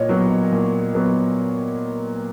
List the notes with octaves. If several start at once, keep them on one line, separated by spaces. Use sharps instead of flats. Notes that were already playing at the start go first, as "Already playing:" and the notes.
Already playing: A#2 C#5 D#5
F#3 B3
A#2
F#3 B3